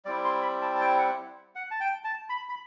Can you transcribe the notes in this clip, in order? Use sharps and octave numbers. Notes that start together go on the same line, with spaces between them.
G3 C4 E4 D5
C6
B5
A5
A5
G5
F#5
F#5
A5
G5
A5
B5
B5